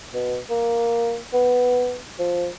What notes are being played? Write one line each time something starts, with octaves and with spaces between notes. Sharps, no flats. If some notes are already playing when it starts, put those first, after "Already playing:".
B2
A#3
B3
F3